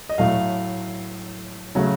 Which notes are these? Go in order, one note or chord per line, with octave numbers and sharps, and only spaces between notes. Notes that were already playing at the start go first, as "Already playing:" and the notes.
D#5
A2 F#3 A3 F5
C#3 F#3 A3